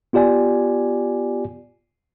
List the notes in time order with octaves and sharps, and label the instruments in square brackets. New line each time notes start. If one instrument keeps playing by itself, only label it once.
[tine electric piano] B3 F4 G4 D5 G#5